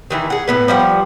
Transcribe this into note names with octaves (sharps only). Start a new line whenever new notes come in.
D#3 E3 E4
G#4 F#5
A2 B3 B4
F3 G3 F#5